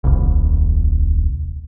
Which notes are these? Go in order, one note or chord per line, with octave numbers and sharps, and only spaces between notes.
D#1 C2